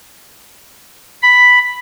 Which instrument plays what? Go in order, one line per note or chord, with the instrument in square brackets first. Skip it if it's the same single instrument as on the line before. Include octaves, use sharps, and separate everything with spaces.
[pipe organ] B5